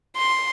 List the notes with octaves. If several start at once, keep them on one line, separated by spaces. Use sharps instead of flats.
C6